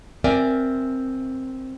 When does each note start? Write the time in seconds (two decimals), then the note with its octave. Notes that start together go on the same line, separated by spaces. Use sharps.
0.24 C4 A#4 D5 E5 G#5